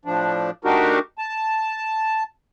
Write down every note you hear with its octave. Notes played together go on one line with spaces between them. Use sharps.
A2 F3 D4
A3 D4 D#4 F#4 G4 A#4
A5